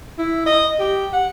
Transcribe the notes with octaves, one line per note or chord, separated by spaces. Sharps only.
E4
D#5
G4
F#5